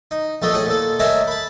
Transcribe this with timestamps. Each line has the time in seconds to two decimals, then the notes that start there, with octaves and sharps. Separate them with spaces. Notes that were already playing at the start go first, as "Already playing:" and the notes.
0.11 D#4
0.42 A#1 A3 B3 A4 D#5
0.54 A2 G#4 F#5 D#6
0.66 A#2 A4
0.99 G#3 A3 A#4 C#5 E5
1.28 A5 B5